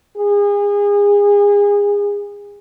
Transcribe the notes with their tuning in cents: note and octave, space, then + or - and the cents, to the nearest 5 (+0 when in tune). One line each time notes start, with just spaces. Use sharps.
G#4 -30